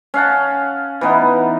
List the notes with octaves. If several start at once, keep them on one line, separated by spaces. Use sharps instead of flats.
C#4 F5 F#5 A5
E3 B3 D#4